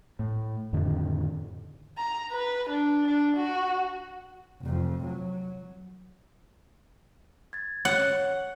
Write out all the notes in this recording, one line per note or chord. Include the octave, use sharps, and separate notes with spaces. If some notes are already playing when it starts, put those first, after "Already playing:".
A2
F2 A2 D3 D#3
A#5
B4
D4
D4
F#4
F1 F2
F#3
G#6 A6
C#5 F#5